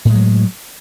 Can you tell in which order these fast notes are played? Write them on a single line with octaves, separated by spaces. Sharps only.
A2 G#3 F#3